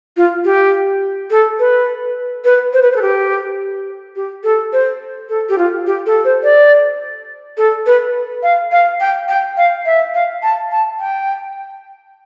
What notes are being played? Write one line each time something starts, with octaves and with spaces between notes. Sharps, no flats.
F4
G4
A4
B4
B4
C5
B4
C5
A4
G4
G4
A4
C5
A4
G4
F4
G4
A4
C5
D5
A4
B4
F5
F5
G5
G5
F5
E5
F5
A5
A5
G5